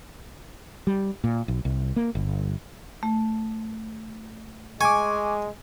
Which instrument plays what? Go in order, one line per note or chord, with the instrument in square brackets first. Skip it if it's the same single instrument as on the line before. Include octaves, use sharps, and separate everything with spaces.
[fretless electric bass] G3
A#2
B1
C2
A#3
G1
[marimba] A3
[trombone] G#3 [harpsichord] G#5 [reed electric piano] C#6 D6